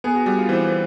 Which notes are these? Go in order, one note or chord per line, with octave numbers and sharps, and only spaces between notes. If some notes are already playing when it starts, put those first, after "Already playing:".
B3 G#4
F#4
G3 F#4
F4
E3 C4
C4